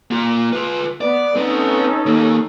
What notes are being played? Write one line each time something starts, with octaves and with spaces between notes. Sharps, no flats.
A#3 F4
F4 B4
B3 D5
C4 C#4 D#4 A4 B4
D#3 A#3